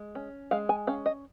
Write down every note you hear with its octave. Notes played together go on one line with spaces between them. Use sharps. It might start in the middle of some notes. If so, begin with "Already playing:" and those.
Already playing: G#3
C#4
G#3 F5
G#5
C#4 F5
D#5